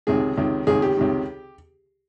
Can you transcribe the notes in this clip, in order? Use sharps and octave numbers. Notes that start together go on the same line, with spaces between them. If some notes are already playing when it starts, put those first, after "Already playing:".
C#2 C3 D#3 G#4
C#2 C3 D#3
C#2 C3 D#3 G#4
G4
C#2 C3 D#3